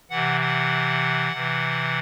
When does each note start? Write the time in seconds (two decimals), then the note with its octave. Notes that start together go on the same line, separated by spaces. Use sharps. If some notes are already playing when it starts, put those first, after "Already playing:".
0.10 C3 E3 F#5
0.41 F#5
1.33 C3 E3